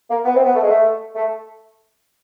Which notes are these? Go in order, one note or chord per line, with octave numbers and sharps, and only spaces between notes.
A#3
B3
C4
B3
A3
G#3
A3
A3